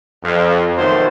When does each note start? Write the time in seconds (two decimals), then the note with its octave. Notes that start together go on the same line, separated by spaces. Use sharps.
0.23 F2
0.77 B1 D#3 F#3 A3 C5